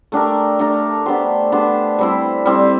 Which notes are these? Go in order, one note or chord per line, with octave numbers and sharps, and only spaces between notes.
A3 D4 G4 A#4
A3 D4 G4 A#4
B3 D4 G4 C5
B3 D4 G4 C5
G3 C4 E4
G3 C4 E4